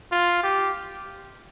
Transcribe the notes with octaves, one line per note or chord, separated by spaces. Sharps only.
F4
G4